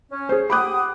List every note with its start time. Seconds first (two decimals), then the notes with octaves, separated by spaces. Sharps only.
0.11 C#4
0.29 G#4 C5
0.50 G4 F#5 B5 D6 D#6 F#6